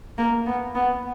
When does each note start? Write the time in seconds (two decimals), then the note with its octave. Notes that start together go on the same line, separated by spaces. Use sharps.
0.18 A#3
0.46 B3
0.75 B3